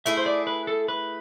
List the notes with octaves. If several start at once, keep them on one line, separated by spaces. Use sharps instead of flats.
A3 E4 G#4 E5
C5
D5
B4
A4
B4